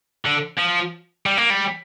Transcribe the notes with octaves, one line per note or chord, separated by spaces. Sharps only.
D3
F3
G3
A#3
G3